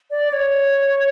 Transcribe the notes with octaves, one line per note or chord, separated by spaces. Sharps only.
D5
D5
C#5